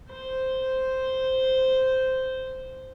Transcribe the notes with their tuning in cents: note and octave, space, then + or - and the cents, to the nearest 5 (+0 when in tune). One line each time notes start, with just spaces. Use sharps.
C5 -5